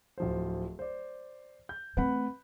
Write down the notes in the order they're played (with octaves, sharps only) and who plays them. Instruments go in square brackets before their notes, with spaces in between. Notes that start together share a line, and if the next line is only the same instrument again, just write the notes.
[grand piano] D1 F3 C5
C5 D5
G6
[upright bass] A3 C4 [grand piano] B4 F#5 B5